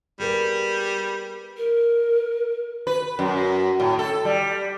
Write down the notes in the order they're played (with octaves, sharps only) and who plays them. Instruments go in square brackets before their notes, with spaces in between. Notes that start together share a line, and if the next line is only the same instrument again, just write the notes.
[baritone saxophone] G3 [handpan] G#4 A#4 B4
[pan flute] A#4
[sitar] B4
F#2
A2
A4
G3